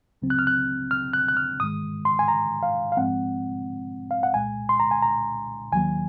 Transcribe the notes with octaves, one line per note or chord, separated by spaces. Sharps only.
C#2 C#3 F#3 C4
F#6
F6
F#6
F6
F#6
F#6
F6
G#2 D#3 G#3 D#6
C6
G#5
A#5
F5
F5
G#2 F3 G#3 C4 F#5
F5
F#5
C2 A#2 G#3 G#5
C6
A#5
G#5
A#5
D#2 D#3 F#3 A#3 G#5